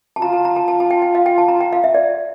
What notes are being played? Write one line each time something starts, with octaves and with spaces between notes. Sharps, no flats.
A5
F4 A#5
A5
A#5
A5
A5
A5
G5
G5
F5
G5
A5
A#5
G5
F5
E5
D5